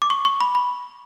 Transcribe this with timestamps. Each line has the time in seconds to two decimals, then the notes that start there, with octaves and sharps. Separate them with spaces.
0.02 D6
0.10 C#6
0.25 C#6
0.41 B5
0.55 B5